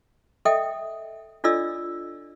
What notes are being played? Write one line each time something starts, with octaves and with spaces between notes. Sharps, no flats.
A4 D#5 E5 G5 D#6
D4 F4 A4 D5 D#5 E6